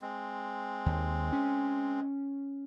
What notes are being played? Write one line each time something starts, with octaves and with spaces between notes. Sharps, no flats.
G#3 C4
D#2
C#4